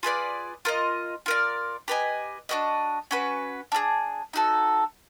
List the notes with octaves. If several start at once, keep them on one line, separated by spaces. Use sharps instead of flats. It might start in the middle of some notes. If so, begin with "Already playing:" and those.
F4 G#4 B4 D5
F4 A#4 D#5
F4 A#4 D5
G4 B4 D#5 G#5
D4 F#4 B4 D#5
C#4 F#4 B4
D4 F4 G#4
D#4 F#4 A4